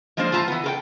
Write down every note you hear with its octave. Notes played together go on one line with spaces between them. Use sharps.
F3 G#3 A#3 D4 C5
A2 F3 F4 A5 A#5
E3 B3
A4 A#4 G5